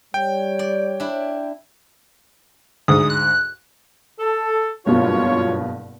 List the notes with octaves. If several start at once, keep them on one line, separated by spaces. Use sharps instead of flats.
G3 C#5 G5
D5
D4 E4
D2 G#2 D#6
F#6
A4
F#1 G2 B2 F4 C#5